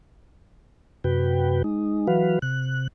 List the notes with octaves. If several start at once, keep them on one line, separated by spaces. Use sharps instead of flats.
F#2 C3 F#4 B4 G5
G#3 D#4
E3 F#3 F#4 B4 F5
C3 F#6